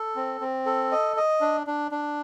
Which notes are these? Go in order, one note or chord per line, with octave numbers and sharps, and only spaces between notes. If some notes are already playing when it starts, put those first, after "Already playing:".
Already playing: A4
C4
C4
A4
D#5
D#5
D4
D4
D4